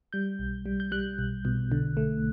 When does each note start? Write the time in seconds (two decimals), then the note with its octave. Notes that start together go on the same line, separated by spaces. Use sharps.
0.13 G3 G6
0.39 B1
0.66 G3
0.80 G6
0.92 G3 F#6
1.19 B1
1.45 B2
1.72 D3
1.97 A3